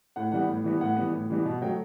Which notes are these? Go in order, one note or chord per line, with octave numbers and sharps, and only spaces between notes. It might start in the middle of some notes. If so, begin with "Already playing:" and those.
A2 F#5
E3 G3 B3 F#5
A2
E3 G3 B3
A2 F#5
E3 G3 B3
A2
E3 G3 B3
B2
F#3 A3 G5